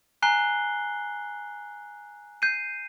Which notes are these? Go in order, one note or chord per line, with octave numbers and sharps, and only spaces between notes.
G#5 A#5 F#6 C7 G7
G6 C7 D#7